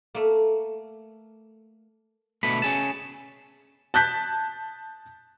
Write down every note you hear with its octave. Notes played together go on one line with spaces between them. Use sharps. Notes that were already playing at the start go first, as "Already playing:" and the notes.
A3 A#3
B2 D3 A3 B5
C#4 G#4 A5
A5 F#6 G6 B6